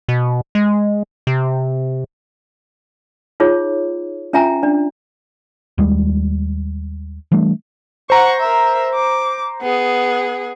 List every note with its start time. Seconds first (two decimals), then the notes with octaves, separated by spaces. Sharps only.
0.09 B2
0.55 G#3
1.27 C3
3.40 D#4 F4 G#4 C#5
4.33 C#4 F4 E5 G5 G#5 A#5
4.63 D4 D5
5.78 D#2 G3 G#3
7.32 E3 G3 A3 D4
8.10 C5 F#5 A#5 C#6
8.40 A#4 E5
8.95 D6
9.62 B3 G#4